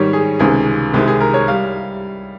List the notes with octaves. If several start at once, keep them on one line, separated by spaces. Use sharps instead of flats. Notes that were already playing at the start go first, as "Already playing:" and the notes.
Already playing: G#2 D#3 G3 C#5
G#4
C#2 C3 D#3 G#3 G#4
C2 C3 D#3 G#3 G4
G#4
A#4
C#5
G3 F5